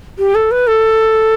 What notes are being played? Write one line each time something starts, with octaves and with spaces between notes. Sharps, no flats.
G4
A4
B4
A4